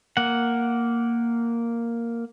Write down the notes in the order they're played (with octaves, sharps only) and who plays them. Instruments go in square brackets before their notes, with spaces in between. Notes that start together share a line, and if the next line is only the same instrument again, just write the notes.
[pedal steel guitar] A#3 F#5